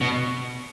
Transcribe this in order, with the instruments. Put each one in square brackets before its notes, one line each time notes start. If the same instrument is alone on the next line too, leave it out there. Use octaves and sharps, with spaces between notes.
[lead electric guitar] B2